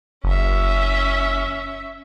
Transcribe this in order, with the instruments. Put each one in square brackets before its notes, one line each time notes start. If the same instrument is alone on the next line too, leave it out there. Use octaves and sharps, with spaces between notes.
[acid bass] F#1 [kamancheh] C#4 E5